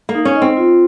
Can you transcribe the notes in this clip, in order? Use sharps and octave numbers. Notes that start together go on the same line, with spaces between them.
A#3
D#4
C#4
D#5
C4
F4